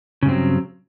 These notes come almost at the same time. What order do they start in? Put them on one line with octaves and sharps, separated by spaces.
C#3 G2 C4 F#3